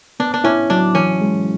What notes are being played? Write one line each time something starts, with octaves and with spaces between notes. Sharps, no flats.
B3 D4
D4
C#4 E4
F#3 D4
E3 C#4
G#3